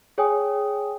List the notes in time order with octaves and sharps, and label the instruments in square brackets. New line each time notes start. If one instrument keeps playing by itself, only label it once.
[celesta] G#4 C#5 G5 G#5 D#6